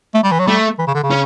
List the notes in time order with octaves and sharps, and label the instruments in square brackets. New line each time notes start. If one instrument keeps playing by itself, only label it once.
[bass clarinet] A3
G3
E3
F#3
[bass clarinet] G3 [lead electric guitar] A3
[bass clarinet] E3
C#3
D3
C#3
[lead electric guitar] C#4